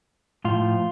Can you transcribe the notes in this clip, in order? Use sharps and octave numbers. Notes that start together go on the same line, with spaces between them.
A2 F3 F4